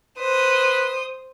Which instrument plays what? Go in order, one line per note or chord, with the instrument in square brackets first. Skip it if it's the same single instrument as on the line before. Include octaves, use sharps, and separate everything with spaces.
[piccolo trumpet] B4 [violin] C5 D#6